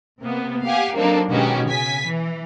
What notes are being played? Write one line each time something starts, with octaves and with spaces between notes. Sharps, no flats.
C3 A#3 B3
G4 F5 F#5 G#5
F#3 A#3 C4 D4 D#4 A4
B2 D#3 G#3 C#4 F#4 G4
C#3 G#5 B6
E3